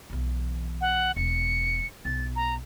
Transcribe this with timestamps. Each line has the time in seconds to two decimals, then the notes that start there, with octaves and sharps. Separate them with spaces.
0.10 B1 E3
0.81 F#5
1.16 E1 C#7
2.05 B1 A6
2.36 A#5